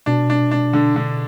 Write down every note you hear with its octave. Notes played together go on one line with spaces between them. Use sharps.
B2 D4
D4
D4
D3
D3